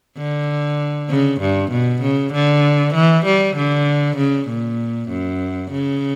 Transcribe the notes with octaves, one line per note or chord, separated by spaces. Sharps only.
D3
C#3
G2
B2
C#3
D3
E3
G3
D3
C#3
A#2
F#2
C#3